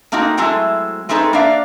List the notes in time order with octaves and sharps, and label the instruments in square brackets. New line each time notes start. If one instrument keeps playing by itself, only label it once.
[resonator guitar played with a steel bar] A3 A#3 C4 D#4 F#4
F#3 G#3 A3 C4 E4
G#3 A3 C4 D#4 A4 B4
A#3 D4 D5 E5 F5